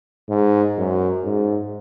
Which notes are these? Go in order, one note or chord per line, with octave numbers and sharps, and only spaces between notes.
G#2
F#2
G#2